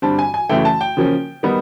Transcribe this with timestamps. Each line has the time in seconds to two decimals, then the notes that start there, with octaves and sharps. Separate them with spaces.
0.02 G2 D3 G3 C4 A5
0.19 G#5
0.34 G#5
0.49 F#2 C#3 E3 A3 G5
0.65 A5
0.81 G5
0.97 C#3 F3 A#3 C#4
1.43 D#3 G3 B3 D#4